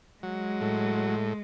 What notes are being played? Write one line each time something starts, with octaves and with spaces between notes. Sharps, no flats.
F#3 G#3
A2